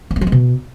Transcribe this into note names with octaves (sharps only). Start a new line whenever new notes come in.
E3
A3
F3
G#3
B2